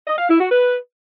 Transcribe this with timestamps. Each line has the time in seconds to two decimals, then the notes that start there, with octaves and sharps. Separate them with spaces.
0.08 D#5
0.19 F5
0.30 E4
0.41 F#4
0.51 B4